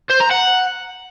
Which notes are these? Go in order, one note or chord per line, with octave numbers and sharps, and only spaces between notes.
C5
A#5
F#5